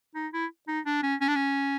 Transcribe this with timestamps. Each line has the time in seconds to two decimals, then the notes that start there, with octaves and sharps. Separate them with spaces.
0.15 D#4
0.33 E4
0.68 D#4
0.86 D4
1.03 C#4
1.21 C#4
1.28 D4
1.36 C#4